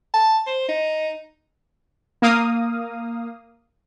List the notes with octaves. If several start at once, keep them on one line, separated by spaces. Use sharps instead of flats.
A5
C5
D#4
A#3 F5 D#6